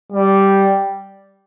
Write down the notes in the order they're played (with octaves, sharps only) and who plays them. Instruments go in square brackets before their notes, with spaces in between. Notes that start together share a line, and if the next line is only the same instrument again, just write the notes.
[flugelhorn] G3